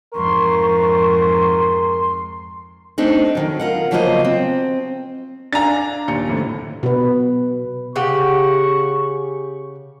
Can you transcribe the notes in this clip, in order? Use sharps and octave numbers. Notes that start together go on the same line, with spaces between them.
F2 G#2 A#4 C6 C#6
A3 C4 D4 D#4
F2 D#3 F#3
F4 A#4 F#5
C#3 F3 F#3 A#3 C5 D#5
C4
D4 F5 G#5 A#5 A6
D#2 A#2 C#7
F2 A2 D3
B2 B4
C#3 G4 F#5 C#6